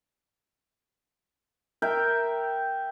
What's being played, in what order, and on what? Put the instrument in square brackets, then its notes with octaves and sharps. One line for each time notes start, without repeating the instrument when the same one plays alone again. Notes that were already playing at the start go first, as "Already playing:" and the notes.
[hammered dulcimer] A#4 E5 G5